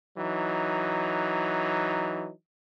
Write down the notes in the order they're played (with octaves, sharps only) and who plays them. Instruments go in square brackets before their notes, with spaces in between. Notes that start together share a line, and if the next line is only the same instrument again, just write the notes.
[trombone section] E3 F#3 D#4